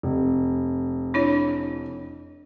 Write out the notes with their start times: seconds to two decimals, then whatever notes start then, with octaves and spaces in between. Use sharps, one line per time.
0.03 F1
1.14 D4 E4 C#5